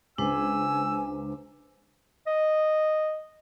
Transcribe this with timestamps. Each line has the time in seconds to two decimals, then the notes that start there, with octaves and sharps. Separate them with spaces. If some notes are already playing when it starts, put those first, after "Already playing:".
0.18 C#2 D4 B4 C5 G#5 E6
2.27 D#5